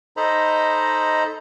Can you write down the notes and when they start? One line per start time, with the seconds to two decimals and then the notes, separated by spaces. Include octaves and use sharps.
0.17 D#4 A4 C5 D#5 A#5 B5